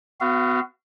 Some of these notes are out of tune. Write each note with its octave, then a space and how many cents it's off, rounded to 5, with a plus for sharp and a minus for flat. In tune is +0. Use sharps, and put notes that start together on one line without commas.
B3 +30 F#4 +0 F5 -30